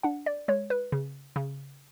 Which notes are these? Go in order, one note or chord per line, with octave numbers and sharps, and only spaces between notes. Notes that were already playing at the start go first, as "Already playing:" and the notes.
D4 F#5
D5
G#3 C#5
B4
C#3
C#3